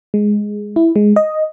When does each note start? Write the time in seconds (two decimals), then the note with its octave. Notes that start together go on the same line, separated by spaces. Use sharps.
0.14 G#3
0.76 E4
0.96 G#3
1.16 D#5